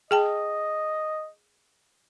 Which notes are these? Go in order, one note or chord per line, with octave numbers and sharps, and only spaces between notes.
G#4 D#5 G5 A5